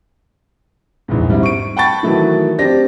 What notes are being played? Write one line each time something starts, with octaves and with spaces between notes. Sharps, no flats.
A#1 E2 G#2
G#2 G3 C4 E4
C#6 D7
F#5 G5 A5 B5 C#6 A6
D#3 E3 F#3 A3 D#4
C4 D4 G4 D5 A#6